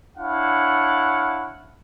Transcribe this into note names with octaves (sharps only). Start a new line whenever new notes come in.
D4 E4 C#5 F5 F#5